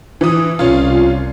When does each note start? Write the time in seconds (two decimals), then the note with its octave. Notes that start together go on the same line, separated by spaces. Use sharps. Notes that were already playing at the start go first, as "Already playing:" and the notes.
0.21 E3 D#6
0.59 C2 C#4 F4